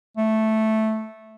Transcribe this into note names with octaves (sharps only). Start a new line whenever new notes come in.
A3